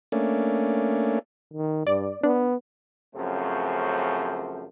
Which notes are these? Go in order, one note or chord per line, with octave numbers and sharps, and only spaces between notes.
A3 A#3 C#4 D4
D#3
G2 D5
B3 D4
F#2 C#3 F3 A3 C4